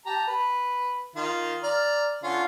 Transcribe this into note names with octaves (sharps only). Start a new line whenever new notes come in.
G4 A5 A#5
B4
D#3 F4
D5 A#5 F6
D3 C#4 F4